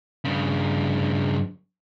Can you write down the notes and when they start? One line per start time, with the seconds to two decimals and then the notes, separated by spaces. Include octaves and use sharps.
0.25 G2 C#3